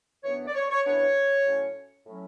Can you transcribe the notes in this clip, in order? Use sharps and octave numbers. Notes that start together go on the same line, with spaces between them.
F#2 E3 B3 D4 C#5
D5
C#5
C#5
F#2 E3 B3 D4 C#5
A2 F#3 C#4
A2 F#3 C#4